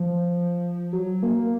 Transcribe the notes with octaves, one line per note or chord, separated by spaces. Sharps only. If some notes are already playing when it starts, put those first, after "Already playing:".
Already playing: F3
F#3
A#3